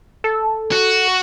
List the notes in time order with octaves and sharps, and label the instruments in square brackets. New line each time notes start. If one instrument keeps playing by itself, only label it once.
[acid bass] A4
[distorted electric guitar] F#4